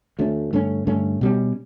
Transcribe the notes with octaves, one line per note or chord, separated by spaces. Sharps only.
D2 D3 A3 C#4
G2 D3 A3 C#4
G2 D3 A3 C#4
B2 G3 C#4